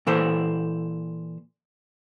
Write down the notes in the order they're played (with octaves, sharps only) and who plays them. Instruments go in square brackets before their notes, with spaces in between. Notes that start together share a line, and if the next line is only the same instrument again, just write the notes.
[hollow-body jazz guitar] A#2 E3 A4 C5